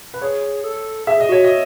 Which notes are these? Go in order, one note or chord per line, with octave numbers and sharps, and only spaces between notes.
B4
G#4 C#5
A4
G#4 E5
D#5
F#4 C#5
D#5